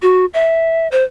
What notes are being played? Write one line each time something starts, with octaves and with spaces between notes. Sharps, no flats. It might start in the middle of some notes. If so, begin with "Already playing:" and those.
F#4
E5
C5